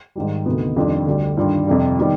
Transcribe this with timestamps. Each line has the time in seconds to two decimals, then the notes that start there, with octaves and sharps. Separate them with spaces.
0.16 G#2 D#3 G3
0.46 D2 C3 D#3 B3
0.76 F2 D#3 G3 D4 F4
1.06 D2 D3 G3
1.37 G2 D#3 G3 D4 F4
1.67 F2 C3 G3
1.99 D#3 G3 B3 D#4